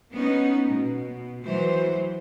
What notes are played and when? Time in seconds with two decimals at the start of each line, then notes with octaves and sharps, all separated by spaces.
0.11 B3 C#4 D#4
0.68 B2
1.43 E3 F#3 C5